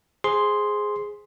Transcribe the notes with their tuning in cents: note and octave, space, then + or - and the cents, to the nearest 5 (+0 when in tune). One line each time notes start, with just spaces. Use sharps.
G#4 +0 C5 +0 C6 +0